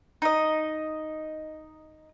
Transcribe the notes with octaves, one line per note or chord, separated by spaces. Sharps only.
D#4 D#5